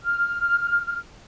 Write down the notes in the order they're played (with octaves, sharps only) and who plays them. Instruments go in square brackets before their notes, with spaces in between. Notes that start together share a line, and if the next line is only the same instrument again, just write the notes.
[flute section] F6